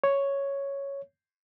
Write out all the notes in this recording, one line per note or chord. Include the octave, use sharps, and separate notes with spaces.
C#5